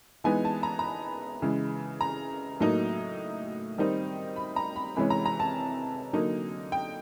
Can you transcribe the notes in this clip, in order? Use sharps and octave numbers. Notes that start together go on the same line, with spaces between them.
E3 G#3 B3 D#4 G#5
A5
A#5
A#5
B5
C#3 E3 G#3
A#5
A2 F#3 A#3 D#4
D#3 G3 C4 D#4
B5
A#5
B5
C3 E3 G#3 C#4 B5
A#5
A#5
A5
D3 F#3 A#3 D#4
G5